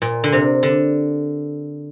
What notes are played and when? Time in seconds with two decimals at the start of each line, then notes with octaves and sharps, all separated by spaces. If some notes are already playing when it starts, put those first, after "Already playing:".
0.02 A#2
0.24 D3
0.32 C3
0.63 D3